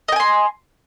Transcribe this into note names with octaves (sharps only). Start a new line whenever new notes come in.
D#5 G5 G#5 C6